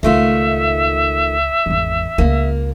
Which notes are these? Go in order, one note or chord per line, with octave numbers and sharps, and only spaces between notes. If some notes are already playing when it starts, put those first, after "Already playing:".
C#2 D#3 A3 D#4 F4 E5
G#1 E2
C#2 A#3 F4